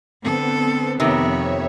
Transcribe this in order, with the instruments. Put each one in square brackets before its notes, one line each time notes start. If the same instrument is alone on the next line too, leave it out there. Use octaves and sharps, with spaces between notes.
[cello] D3 A4 [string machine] B3 C4
[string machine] F2 C#5 E5 [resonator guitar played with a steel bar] C3 D#3 [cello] B3